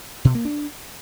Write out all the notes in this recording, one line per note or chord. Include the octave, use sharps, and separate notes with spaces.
B2
A#3
D4